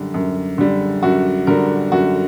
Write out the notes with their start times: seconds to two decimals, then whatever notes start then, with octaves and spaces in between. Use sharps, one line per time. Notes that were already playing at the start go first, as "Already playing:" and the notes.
Already playing: F#2 D3 G3
0.14 F#2
0.58 D3 G3
1.03 F#2 F#4
1.47 D3 G3 A#4
1.92 F#2 F#4